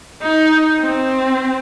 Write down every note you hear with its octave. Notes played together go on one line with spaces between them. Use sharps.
D#4
C4